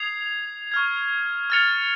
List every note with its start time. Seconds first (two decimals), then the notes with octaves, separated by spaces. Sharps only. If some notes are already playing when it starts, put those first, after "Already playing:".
Already playing: D#6 G#6 C7 F7
0.72 C#6 F6 G#6
1.50 F6 A6 C#7 F7